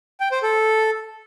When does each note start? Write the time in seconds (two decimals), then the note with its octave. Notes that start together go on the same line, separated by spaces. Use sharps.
0.20 G5
0.31 C5
0.43 A4